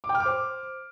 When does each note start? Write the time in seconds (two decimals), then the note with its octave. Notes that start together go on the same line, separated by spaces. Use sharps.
0.04 D6
0.09 G5
0.15 F6
0.20 D6
0.26 C5